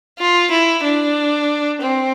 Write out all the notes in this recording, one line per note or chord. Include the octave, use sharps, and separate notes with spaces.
F4
E4
D4
C4